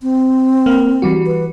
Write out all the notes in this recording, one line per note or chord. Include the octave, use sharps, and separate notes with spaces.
C4
A#3
E3 G3 F#4
B4